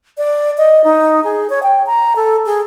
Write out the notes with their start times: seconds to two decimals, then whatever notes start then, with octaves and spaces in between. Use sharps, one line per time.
0.18 D5
0.58 D#5
0.84 D#4
1.24 G#4
1.50 C#5
1.63 G5
1.86 A#5
2.16 A4
2.46 G#4